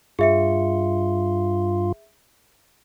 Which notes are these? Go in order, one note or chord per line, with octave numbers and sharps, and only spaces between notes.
G2 F4 G#4 E5 C#7